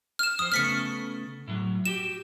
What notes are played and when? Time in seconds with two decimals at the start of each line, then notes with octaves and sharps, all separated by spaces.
0.19 F6 E7
0.39 F2 C5 D#6
0.52 C#3 A3 B3 F6 B6 C#7
1.48 A2 F#3
1.85 F#4 G4 E7